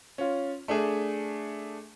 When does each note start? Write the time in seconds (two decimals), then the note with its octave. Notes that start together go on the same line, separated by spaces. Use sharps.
0.18 C#4 F4
0.68 A3 D4 G#4